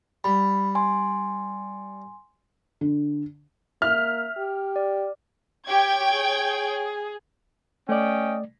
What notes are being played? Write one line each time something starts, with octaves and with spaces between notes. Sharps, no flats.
G3 B5
G#5 C6
D3
A#3 E5 F6
G4
D5
G4 C#5 G5 G#6
G#4
A3 C#4 D5 D#5 G5